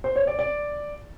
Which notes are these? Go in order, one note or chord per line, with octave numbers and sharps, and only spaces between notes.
C5
C#5
D5
D5